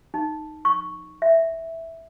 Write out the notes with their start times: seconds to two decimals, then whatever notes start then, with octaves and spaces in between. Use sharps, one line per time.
0.14 D#4
0.65 C#6
1.22 E5